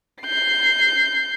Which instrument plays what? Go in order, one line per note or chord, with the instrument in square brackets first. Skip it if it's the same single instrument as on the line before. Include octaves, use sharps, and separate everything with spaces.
[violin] G6 C7